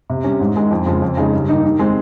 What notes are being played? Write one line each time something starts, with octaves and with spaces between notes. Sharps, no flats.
C3
G3 C#4
G#2
D#3 G#3 D#4
F2
C#3 F3 G#3
F2
C#3 G#3 D#4 G#4
G2
D#3 G3 A#3 D#4
D#3
G#3 C4